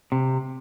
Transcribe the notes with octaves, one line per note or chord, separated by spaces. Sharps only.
C3